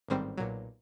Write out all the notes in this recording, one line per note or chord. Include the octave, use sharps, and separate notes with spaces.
A1 G#2 D#3 G3 C4
B1 A#2 F#3